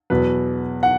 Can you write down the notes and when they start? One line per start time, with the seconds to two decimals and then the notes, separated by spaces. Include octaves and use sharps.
0.10 E2 B2 F#3 B4
0.83 F#5